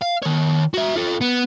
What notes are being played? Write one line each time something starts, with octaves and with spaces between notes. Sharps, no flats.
F5
D#3 C#5
F#4 E5
F4 A4
B3